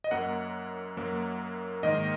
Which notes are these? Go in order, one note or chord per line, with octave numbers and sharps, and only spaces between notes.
D#5
F#2 F#3 A#3 F#5
F#2 F#3 A#3
G#2 D#3 A#3 D#5